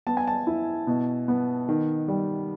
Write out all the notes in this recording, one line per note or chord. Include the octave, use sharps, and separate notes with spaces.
B3 A5
G#5
A5
E4
B2
B3
D#3
G3